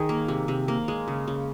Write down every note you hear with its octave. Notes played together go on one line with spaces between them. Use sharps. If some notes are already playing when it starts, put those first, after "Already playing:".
Already playing: D#3 G#4
A#3
C3
C3
A#3
G#3
C#3
C#3